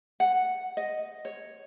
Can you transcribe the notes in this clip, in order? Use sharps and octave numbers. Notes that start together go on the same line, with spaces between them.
F#5
D#5
C#5